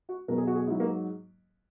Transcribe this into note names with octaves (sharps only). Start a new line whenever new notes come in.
F#4
E2 B2 F#3 A#4
G#4
F#4
G#4
G#2 F#3 E4
A#3